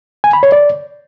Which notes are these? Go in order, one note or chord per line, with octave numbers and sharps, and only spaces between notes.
G#5
B5
C#5
D5